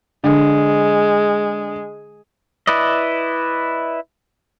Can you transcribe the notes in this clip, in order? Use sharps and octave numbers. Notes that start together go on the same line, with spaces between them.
D3 G#3
E4 B4 D5 D#5